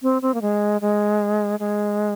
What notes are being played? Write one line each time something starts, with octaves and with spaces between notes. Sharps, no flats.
C4
C4
A#3
G#3
G#3
G#3